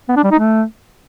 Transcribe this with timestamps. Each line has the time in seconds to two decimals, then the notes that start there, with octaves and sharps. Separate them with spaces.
0.09 B3
0.16 D4
0.24 G3
0.31 D#4
0.39 A3